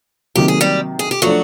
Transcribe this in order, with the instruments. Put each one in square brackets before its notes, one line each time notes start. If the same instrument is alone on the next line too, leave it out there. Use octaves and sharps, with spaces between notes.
[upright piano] C3 D#3 F#3 A#3 [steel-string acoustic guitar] G4
[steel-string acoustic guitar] G#4
G3 G4
G#4
G4
[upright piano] F3 A3 D4 [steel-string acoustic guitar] F#3 F#4